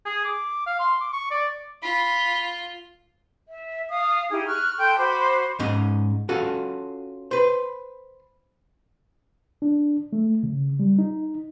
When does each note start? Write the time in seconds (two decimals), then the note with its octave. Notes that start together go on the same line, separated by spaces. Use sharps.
0.05 G#4
0.25 D6
0.66 F5
0.79 C6
1.01 D6
1.13 C#6
1.31 D5
1.83 F4 B5
3.49 E5
3.90 F5 D#6
4.31 D#4 E4 G4 G#4
4.46 C#6 F6 F#6
4.78 A4 G5 C6 G6
4.97 F#4 C5 B5 D6
5.59 G#2 C#4 D#5
6.29 C#4 F4 F#4 A4
7.31 B4 C5
9.62 D4
10.13 A3
10.43 C#3
10.79 G3
10.98 D#4